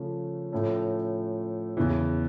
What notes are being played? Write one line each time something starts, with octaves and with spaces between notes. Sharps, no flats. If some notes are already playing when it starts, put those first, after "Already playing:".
Already playing: C#3 F3 A3 C#4
A2 F3 A3 C#4
E2 C#3 E3